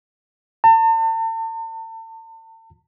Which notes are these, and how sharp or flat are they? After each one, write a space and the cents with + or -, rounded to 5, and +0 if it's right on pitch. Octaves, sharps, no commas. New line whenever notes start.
A5 +40